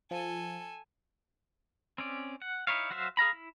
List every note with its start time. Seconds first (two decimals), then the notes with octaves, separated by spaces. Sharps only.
0.11 F3 A4 G#5
1.98 C4 C#4 D5
2.42 F#5
2.67 D#4 E4 C#5 F5
2.90 F#3 F#4 C5 E5 F5
3.17 G#4 F5 A#5 B5
3.33 E4